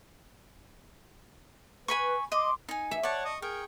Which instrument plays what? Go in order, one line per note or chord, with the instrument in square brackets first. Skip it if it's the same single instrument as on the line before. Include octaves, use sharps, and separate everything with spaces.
[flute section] B4 [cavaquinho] G#5 B5 C#6
[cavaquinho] D#5 [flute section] C6 D6
[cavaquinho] D#4 G#5
[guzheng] E5
[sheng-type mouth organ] C#5 F#5 C#6 [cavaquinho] D5 A5
[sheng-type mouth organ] D#5 C#6 D#6
[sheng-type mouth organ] G#4 G5 C#6 [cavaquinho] A#4